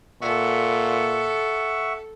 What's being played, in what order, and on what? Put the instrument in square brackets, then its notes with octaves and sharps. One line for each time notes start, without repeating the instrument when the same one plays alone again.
[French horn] A#2 [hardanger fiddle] A4 [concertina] E5 F#5 C#6